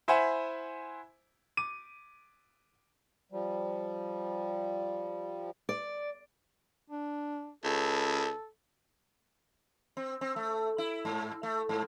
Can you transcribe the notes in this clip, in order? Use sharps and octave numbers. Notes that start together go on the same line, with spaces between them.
E4 C5 E5 F#5 G#5
D6 D#7
F3 G3
D5
D4
C#2 A4
C4
C4
A3
E4
G#2
A3
G#2